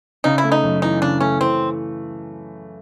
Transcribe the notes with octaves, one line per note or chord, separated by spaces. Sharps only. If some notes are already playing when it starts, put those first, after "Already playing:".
C#3 D#4
E4
A3
D#4
F#2
E3 D#4
C#3 D4
A3 C#4
E3 C4